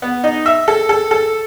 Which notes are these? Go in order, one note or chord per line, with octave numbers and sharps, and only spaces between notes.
B3
D#4
E5
A4
A4
A4